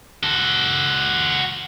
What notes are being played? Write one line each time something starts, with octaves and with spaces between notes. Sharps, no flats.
F#4 A4